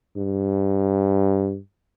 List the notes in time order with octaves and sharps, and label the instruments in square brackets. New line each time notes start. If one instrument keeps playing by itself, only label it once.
[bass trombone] G2